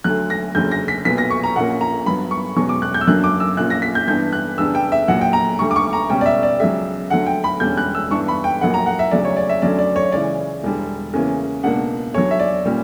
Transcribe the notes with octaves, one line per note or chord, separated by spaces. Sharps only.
D2 D3 F#3 F#6
A#6
F#1 E2 D3 F#3 C#4 G6
A#6
B6
B1 A#2 F#3 B3 B6
A#6
C#6
A#5
A#1 A#2 A#3 C#4 F#5
A#5
G2 F#3 B3 B5
C#6
E1 E2 B2 F#3 C#4 C#6
D6
F#6
G6
E6
F#2 D3 F#3 A#3 D4 F#6
D6
E6
A#1 A#2 A#3 C#4 F#6
A#6
B6
G6
G2 E3 B3 D4 G6
F#6
E2 C#3 G3 B3 D4 E6
G5
E5
A#1 A#2 F#3 F#5
G5
A#5
D2 D3 G3 C#6
D6
C#6
A#5
C#2 B2 G3 C#4 G5
D5
E5
D5
C#2 C#3 F#3 E5
D2 D3 F#3 F#5
G5
B5
E1 E2 D3 G3 C#4 G6
F#6
E6
G2 E3 B3 D4 C#6
B5
G5
A#1 A#2 F#3 A#3 F#5
A#5
F#5
E5
D2 C#3 F#3 D5
C#5
D5
E5
D2 D3 F#3 C#4 D5
D5
C#5
C#2 C#3 E3 D5
E1 E2 D3 G3
E2 C#3 E3 A#3 C#4
C#2 B2 A#3 D4 F#5
E2 D3 F#3 C#5
E5
D5
A#2 G3 C#4